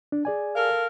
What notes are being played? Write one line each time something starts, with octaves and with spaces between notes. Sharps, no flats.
D4
G#4 D5 G#5
A4 A#4 F5